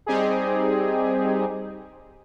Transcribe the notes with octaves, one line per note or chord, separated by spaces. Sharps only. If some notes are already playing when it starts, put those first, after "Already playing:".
G3 C4 D#4 G4 G#4